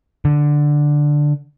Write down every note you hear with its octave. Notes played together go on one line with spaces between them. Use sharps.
D3